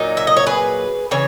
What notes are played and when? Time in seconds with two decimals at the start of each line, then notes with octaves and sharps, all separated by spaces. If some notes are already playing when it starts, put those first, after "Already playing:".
Already playing: A#2 F#3 D#4
0.17 E5
0.27 D#5
0.37 C#5
0.46 G#4 B4
1.11 C#3 E3 C#5